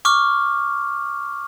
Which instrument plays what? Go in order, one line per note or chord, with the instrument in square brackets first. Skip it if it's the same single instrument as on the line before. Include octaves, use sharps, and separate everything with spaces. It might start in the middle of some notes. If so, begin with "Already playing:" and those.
[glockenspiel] C#6 D6 F6